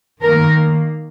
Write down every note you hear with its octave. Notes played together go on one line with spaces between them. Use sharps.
D#3 A#3 A#4